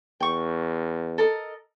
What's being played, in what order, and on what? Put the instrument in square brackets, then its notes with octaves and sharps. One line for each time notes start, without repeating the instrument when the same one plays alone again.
[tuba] E2 [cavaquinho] G5 C#6
[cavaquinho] A4 A#4 D#5